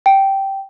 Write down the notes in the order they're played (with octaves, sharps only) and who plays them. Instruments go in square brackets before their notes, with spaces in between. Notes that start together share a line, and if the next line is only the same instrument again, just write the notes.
[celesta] G5